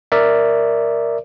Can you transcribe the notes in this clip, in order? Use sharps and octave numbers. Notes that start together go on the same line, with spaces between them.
A#4 D5 E5